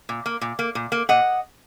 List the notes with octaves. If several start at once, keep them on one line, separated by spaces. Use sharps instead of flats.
A#2
A#3
A#2
A#3
A#2
A#3
A#2 D#5 F#5